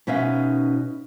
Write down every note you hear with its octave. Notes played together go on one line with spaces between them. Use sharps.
B2 C#4 D#4 E5 F5